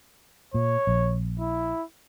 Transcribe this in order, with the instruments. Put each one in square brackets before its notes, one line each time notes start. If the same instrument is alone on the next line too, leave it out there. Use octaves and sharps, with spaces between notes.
[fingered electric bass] A#2 [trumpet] C#5
[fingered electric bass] A#1
[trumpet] E4